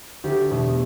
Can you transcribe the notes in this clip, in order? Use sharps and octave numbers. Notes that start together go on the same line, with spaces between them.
D2 G4 A4
E2 B2 A3